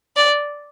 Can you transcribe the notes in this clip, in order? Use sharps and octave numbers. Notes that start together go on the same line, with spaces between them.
D5